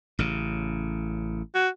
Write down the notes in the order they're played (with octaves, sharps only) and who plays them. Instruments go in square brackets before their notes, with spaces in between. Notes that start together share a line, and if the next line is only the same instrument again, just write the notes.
[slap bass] A1 C#3
[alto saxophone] F#4